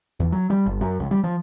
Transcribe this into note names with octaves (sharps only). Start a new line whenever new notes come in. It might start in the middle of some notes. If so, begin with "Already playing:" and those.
E2
F#3
G3
G1
F#2
C#2
G3
F3